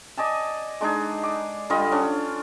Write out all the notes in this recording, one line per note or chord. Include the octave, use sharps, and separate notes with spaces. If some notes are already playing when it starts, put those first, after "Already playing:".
D5 D#5 G#5 A5
G#3 D4 D#4 G#4
D6
D3 G3 F4 D#5
C#4 D4